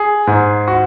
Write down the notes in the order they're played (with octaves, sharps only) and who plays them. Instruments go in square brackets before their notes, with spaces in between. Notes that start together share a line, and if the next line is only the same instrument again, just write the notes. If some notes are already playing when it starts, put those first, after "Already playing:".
Already playing: [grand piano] G#4
G#2
F#4